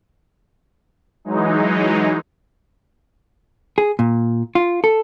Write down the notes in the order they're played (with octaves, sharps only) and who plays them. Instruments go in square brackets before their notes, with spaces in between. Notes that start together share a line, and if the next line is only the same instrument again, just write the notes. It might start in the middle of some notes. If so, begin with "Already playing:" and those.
[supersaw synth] E3 F#3 G#3 D#4
[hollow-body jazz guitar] G#4
A#2
F4
A4